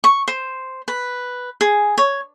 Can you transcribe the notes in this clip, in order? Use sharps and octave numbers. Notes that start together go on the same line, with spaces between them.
C#6
C5
B4
G#4
C#5